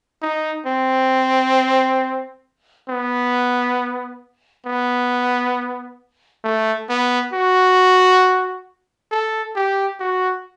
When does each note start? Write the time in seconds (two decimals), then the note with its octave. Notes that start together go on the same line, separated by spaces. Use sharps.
0.22 D#4
0.66 C4
2.89 B3
4.66 B3
6.44 A3
6.89 B3
7.33 F#4
9.11 A4
9.56 G4
10.00 F#4